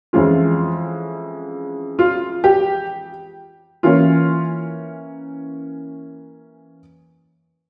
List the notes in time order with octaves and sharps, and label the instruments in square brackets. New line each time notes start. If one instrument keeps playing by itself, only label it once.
[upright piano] F2 E3 G#3 C#4 F4
F4
G4
E3 A#3 C#4 F4